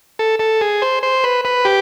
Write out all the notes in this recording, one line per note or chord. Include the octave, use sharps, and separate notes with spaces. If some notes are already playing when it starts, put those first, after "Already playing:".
A4
A4
G#4
C5
C5
B4
B4
G4